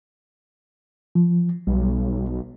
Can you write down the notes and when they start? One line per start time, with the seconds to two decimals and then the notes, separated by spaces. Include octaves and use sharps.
1.15 F3
1.67 B1 G3